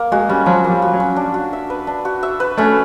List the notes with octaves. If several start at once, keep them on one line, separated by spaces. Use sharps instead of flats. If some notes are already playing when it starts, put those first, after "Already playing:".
Already playing: A#3
G#3 F#4
G3 C#4
F3 F#3
A#3
G3
F#4
F#3
C#4
D4
F#4
E5
B4
D4
F#4
E5
B4
A3 C#4